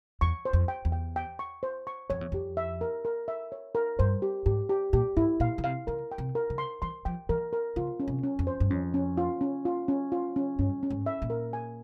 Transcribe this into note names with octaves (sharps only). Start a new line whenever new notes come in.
E2 C#6
C5
F2
G5
E2
G5
G5
C#6
C5
C#6
F2 C#5
E2
F2 G4
E5
A#4
A#4
E5
C#5
A#4
G2 C5
G4
G#2 G4
G4
A#2 G4
G#2 E4
A#2 F5
C#3
C3 F5
C#3 A#4
G5
C3
A#4
C#3
C6
E3 C6
F3 G5
E3 A#4
A#4
C#3 F4
C#4
C3
C#4
F2
C5
G2
F2 C#4
C#4
F4
C#4
F4
C#4
F4
C#4
G2 C#4
C#4
G#2
E5
A#2
A#4
G#5